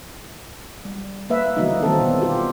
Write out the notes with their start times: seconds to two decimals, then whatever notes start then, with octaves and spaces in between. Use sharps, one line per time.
0.85 G3
1.30 A#3 B4 E5
1.57 D3 E3 F#3 G3 A#3 D#4
1.83 D#3 F#3 G3 A#3 C4 A4
2.00 B2 B3
2.22 F4 G4